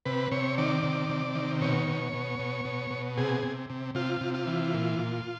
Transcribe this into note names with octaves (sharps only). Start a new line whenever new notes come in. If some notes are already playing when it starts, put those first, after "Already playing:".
C3 B4
C3 C#5
D#3 D5
C3
C3
D#3
B2 C#5
B2
B2
B2
B2
B2
C3 G#4
C3
C3
C3 F4
C3
F4
E3
A#2
A#2